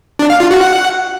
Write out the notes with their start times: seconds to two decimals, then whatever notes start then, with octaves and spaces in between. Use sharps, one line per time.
0.19 D4
0.30 F5
0.40 F4
0.51 F#4
0.61 F#5